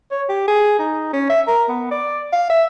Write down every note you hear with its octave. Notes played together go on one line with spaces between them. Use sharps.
C#5
G4
G#4
D#4
C#4
E5
A#4
B3
D5
F5
E5